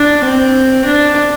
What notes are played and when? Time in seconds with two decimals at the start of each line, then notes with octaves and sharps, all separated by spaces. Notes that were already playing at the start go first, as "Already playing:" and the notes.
Already playing: D4
0.23 C4
0.85 D4